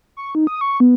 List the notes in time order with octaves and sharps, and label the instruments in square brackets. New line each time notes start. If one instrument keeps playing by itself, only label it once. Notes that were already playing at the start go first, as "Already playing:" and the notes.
[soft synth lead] C#6
D#4
D#6
C#6
B3